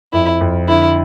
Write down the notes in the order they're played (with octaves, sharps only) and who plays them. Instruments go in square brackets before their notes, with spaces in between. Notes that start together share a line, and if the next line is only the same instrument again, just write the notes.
[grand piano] F2 [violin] E4
[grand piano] F2
[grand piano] D3 [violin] E4